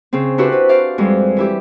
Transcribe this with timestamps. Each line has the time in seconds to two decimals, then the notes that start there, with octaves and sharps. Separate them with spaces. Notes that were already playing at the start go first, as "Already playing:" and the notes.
0.13 C#3 C4
0.38 D4 E4 F#4 G4 B4 C5
0.52 B4
0.69 C5 D5 F5
0.98 F2 G3 G#3
1.37 E3 E4 G4